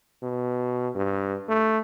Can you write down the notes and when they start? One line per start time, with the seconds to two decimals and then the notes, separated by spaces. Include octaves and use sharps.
0.22 B2
0.95 G2
1.49 A3